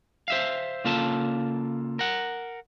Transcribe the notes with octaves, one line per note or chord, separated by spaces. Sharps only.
C5 E5 F5
C#3 A#3 F4 A4 A5
A#4 F#5